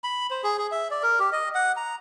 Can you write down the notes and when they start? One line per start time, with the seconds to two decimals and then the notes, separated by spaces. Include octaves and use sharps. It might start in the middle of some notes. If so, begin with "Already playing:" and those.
0.04 B5
0.31 C5
0.44 G#4
0.58 G#4
0.72 E5
0.91 D5
1.03 A#4
1.20 G4
1.33 D#5
1.55 F#5
1.77 A#5